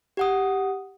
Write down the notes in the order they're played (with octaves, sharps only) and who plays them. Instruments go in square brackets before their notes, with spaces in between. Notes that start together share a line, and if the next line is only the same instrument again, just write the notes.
[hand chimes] G4 F#5 D#6